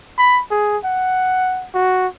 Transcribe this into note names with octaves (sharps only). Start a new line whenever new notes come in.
B5
G#4
F#5
F#4